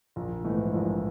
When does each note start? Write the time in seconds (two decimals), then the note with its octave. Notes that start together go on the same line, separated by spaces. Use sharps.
0.16 A#1
0.44 G#2 E3 A3
0.74 A#1